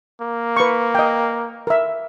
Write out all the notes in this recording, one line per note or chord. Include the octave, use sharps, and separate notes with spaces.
A#3
B4 C#6
D#5 G5
A#4 E5